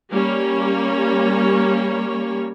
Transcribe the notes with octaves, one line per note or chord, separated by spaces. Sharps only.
G3 A#3 C#4 C#5